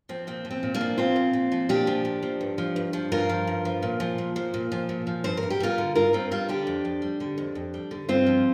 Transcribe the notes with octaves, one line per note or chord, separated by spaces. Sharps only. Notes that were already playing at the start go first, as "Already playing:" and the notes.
F3 C4
A#2 C4
F3
C4
A#2
A#3 D4
F3
A#2 C4 F4
F3
A#2
F3
A#2 D4 G4
F3
A#2
F3
G2
F3
G2
F3
G2 F4 A#4
F3
G2
F3
A#2
F3
A#2
F3
A#2
F3
A#2
F3
G2 C5
A#4
G2
G4
G3 F4 A#4
D3
G2 F4 A#4
G2 C4 F4
G3 F4 A#4
D3 D4 G4
F2
F2
G3
D3
F2
F2
G3
D3
G2 C4 F4
F3